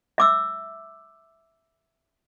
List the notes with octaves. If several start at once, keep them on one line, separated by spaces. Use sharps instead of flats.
E5 D6 E6